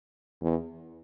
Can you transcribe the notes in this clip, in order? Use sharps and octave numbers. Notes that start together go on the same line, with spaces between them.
E2